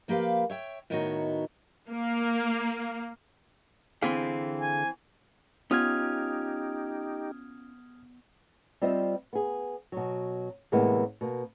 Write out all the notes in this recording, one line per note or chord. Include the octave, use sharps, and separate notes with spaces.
F3 A#3 G4 B4 F5
C#5 E5 G5
A2 D#3 B3 D#4 F#4 C#5
A#3
D3 E3 C4 G#4 F5
G#5
B3 C#4 D#4 F4 G4 D#6 F6 G#6
G3 C4 F4 C5 D#5 E5
B3 G#4
B2 F#3
A2 C3 E3 G#3 A#3 B3
B2 A#3